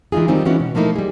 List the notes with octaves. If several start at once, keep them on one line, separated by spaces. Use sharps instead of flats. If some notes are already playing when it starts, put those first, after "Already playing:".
E3 G#3 D#4 F4 G#4
D#3 G3 C4 D#4 F4
E3 G#3 B3 C#4 E4 F#4
B2
F3 A3 A#3 D#4 E4
G3 G#4